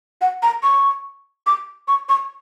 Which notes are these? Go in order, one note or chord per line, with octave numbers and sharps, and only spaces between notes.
F#5
A#5
C#6
D6
C#6
C#6